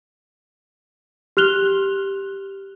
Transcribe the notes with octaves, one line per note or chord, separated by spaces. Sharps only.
G4 F6 F#6 F7 G7